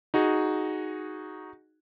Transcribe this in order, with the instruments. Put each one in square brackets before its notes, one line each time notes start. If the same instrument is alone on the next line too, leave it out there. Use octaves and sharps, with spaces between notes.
[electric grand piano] D#4 F#4 G#4